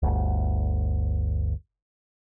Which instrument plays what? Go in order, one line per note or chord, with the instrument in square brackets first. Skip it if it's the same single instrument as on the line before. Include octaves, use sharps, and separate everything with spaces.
[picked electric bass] G1 D2